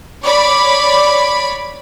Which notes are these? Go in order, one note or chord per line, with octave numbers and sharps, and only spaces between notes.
C#5 D5 B5